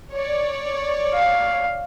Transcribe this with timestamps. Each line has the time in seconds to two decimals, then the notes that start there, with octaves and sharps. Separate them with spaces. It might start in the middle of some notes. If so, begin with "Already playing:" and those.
0.12 C#5 D5
1.15 F5